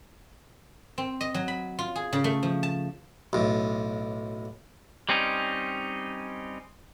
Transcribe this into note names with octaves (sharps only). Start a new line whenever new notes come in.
C4
D#5
F#3
B5
F4
G#4
C#3
A3
F3
A5
B1 A2
G3 C4 C#4 D#4